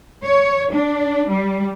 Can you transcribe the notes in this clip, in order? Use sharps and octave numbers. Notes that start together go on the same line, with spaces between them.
C#5
D4
G3